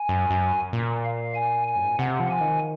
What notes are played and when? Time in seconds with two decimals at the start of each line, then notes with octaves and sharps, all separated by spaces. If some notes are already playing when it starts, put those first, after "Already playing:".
Already playing: G#5
0.09 F#2
0.30 F#2
0.73 A#2
1.04 F5
1.35 G#5
1.68 G#5
1.76 F#2
1.84 G#2
1.91 A#2
1.99 C3 F#5
2.20 F3
2.30 G#5
2.41 D#3